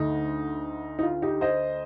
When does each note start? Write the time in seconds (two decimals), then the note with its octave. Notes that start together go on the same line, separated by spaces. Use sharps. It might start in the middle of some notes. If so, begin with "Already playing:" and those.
Already playing: D2 D3 A3 D#4
0.99 D#4
1.03 F4
1.22 D#4 G4
1.41 C5 D#5